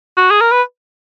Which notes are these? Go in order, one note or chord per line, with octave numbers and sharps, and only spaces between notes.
F#4
G#4
A#4
B4